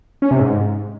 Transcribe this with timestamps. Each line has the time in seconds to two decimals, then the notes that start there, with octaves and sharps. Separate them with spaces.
0.22 C#4
0.31 C3
0.40 G#2